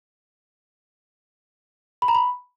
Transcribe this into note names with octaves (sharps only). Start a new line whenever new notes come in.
B5
A#5
B5